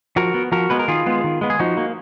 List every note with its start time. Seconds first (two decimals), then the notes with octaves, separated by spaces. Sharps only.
0.16 F3 F#4 A#4
0.34 B3
0.52 F3 F#4 A#4
0.70 G#3 B3 B4
0.79 A#4
0.88 D#3 F4 G#4
1.07 G#3 B3
1.24 D#3
1.41 G#3 B3
1.50 G#4
1.59 F3 D#4 F#4
1.77 A#3